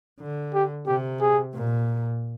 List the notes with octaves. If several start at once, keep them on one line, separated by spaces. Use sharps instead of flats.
D3
G4
C3 G4
G#4
A#2